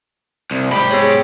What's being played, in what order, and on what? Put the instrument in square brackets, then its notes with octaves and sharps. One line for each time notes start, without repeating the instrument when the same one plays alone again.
[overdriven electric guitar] C2
[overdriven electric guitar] G#2 G4 [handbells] B5
[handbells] B3 G#4 C#5